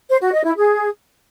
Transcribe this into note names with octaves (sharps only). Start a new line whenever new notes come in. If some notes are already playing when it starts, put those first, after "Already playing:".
C5
F#4
D#5
E4
G#4